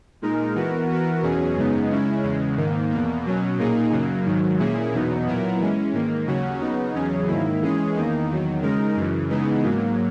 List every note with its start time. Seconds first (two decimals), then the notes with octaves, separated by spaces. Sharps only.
0.22 A#2 G#3 D#4 A#4
0.55 E3 B3 F#4 A#4
0.89 E3 B3 F#4 A#4
1.23 E2 B2 F#3 C#4 G#4
1.56 F#2 C#3 G#3 B3 D#4
1.90 C#3 G#3 C#4 E4
2.23 E2 C#3 G#3
2.57 G#2 D#3 A#3
2.91 E2 B2 A#3
3.24 B2 F#3 C#4
3.58 A#2 A#3 D#4 G#4
3.92 F#2 C#3 F#3 A#3
4.25 G#2 D#3 F#3
4.59 A#2 A#3 C#4 E4 G#4
4.92 E2 B2 F#3 B3 D#4
5.26 A#2 F#3 B3 E4 A#4
5.60 E3 G#3 C#4
5.93 G#2 D#3 A#3
6.27 D#2 C#3 F#3 C#4 F#4
6.61 C#3 F#3 B3 D#4
6.94 E2 C#3 F#3 C#4 G#4
7.27 G#2 D#3 A#3 E4
7.61 E3 G#3 C#4 G#4
7.95 E2 D#3 A#3 D#4
8.29 E2 D#3 F#3
8.62 C#3 G#3 D#4 A#4
8.96 F#2 C#3 E3
9.29 C#3 E3 G#3 B3 D#4
9.63 G#2 F#3 A#3